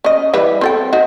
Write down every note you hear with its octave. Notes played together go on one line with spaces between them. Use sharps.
C#4 D#5
E3 G3 B4
C4 A4 G5
D#4 F#4